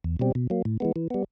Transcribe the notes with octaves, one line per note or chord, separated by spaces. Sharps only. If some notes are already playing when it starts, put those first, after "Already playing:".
E2
B2 G3 C4
B2
F#3 A#3
A2
E3 G#3 B3
E3
G3 B3